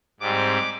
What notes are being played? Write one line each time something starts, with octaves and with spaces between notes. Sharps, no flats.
G#2 G3 C4 D6